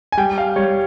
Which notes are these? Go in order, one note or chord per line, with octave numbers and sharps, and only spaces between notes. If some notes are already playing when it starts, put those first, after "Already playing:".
G#5
G3 G5
F5
G3 C#5